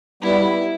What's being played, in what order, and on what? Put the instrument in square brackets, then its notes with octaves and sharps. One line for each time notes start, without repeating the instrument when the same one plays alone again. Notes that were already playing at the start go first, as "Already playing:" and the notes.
[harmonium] G3 B3 [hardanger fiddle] E4